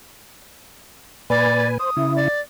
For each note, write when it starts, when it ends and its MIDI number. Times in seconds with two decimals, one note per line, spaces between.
1.30 1.78 46
1.30 1.78 71
1.30 1.67 74
1.30 1.78 80
1.79 1.90 72
1.79 2.13 87
1.97 2.28 49
1.97 2.28 64
2.16 2.41 74